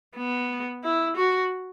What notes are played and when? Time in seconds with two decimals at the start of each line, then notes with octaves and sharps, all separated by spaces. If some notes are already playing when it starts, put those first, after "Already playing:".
0.16 B3
0.84 E4
1.16 F#4